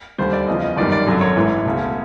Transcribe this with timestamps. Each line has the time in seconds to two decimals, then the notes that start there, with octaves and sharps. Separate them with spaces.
0.18 D#2 D3 G3 C5
0.33 D5
0.47 E2 C#3 F3 D#5
0.62 D#5
0.76 G1 F#2 D#3 G3 D5
0.92 D5
1.06 G#1 F#2 D3 F#3
1.21 C#5
1.36 A1 G#2 E3
1.65 E1 D2 C#3